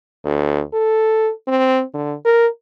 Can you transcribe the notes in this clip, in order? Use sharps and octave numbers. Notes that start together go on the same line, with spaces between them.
D2
A4
C4
D3
A#4